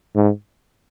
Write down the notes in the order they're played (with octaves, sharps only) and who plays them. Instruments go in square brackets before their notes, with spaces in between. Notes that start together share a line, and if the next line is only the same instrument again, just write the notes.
[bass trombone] G#2